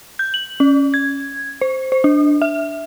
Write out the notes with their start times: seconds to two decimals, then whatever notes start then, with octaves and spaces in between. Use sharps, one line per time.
0.19 G6
0.34 F#7
0.60 C#4
0.94 G#6
1.61 C5
1.92 C5
2.04 D4
2.42 E5